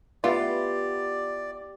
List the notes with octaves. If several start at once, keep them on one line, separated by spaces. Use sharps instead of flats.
B3 E4 F4 G4 D5